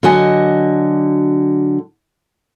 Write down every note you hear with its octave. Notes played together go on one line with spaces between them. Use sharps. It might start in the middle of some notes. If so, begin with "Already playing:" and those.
D3 F#3 F#4 D#5 G#5